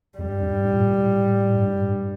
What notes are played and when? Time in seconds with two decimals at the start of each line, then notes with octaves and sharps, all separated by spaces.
0.18 F2 G3
0.30 G2
0.41 F2
0.52 G2
0.64 A2
0.75 A#2
0.87 A#2
0.98 A2
1.56 G2
1.66 A2
1.78 G2